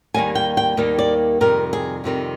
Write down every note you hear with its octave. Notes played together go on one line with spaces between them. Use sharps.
D#2 D#3 G3 A#3 G#5
G5
G5
D#2 D#3 G3 A#3
D5
F2 C3 D#3 G3 A#4
G#4
F2 C3 D#3 G3